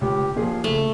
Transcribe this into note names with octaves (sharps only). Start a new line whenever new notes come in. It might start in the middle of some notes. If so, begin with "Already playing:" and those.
C#2 G4
A#2 F3 G#4
C#3 A3